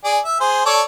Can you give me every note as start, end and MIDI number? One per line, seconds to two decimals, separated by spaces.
0.04 0.19 68
0.04 0.19 74
0.24 0.38 76
0.40 0.61 68
0.40 0.61 72
0.66 0.82 69
0.66 0.82 73
0.66 0.82 74